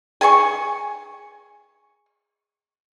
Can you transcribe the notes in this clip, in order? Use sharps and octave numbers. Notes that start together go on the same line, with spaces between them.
G#4 G#5 C6 C#6